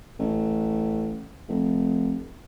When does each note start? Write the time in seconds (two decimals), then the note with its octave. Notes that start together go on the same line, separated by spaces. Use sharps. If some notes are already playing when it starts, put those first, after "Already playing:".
0.19 A1
1.48 F1